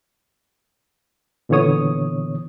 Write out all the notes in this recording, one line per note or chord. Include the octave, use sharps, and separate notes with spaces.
A#2 D3 E3 B3 C#5 D#6